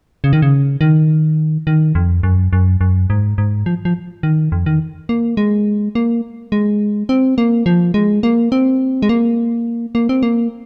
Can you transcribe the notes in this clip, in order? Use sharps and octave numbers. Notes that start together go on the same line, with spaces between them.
C#3
D#3
C#3
D#3
D#3
F2
F#2
F#2
F#2
G#2
G#2
F3
F3
D#3
F2
D#3
A#3
G#3
A#3
G#3
C4
A#3
F3
G#3
A#3
C4
G#3
A#3
A#3
C4
A#3